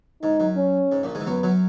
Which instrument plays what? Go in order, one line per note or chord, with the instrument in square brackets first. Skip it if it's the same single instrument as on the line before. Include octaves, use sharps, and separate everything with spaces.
[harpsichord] G#2 [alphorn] D#4
[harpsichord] F#2
[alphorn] C#4
[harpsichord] G#2
A#1 A#2
G#2 G#3
E3
[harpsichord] F#2 F#3 [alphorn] B3
[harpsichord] F#2 F#3